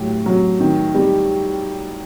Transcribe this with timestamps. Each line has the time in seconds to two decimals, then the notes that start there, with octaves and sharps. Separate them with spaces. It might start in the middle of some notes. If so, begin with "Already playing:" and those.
Already playing: A2 F#3 G4
0.26 F#3
0.60 D#3
0.94 G3